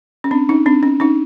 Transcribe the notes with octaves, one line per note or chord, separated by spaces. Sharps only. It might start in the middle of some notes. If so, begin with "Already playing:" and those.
C#4
C4 D4
C#4 D#4
C4 D4
C#4
C#4 D#4